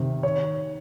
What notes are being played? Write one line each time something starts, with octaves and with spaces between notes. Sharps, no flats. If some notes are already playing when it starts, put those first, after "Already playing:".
Already playing: C3 D#3
C#5